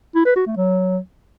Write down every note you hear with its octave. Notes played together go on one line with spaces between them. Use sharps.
E4
B4
F#4
A3
F#3